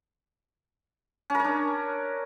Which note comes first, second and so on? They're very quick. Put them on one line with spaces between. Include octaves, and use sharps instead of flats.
C#4 A#4 C#5 D4